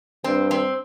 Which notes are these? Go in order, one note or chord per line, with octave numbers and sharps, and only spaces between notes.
G2 C4
C4